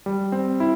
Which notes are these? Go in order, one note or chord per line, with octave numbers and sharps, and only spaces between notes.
G3
C4
E4